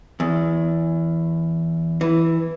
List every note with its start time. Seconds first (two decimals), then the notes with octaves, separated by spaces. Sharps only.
0.20 E2
2.01 E3